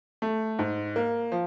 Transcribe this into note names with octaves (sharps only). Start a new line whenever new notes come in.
A3
G#2
A#3
F3